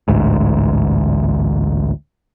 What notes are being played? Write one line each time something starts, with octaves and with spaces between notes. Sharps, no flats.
A1 D2 G#2